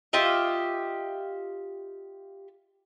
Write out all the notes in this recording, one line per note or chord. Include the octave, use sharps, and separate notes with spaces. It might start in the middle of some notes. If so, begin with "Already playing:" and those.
F4 G4 D#5 E5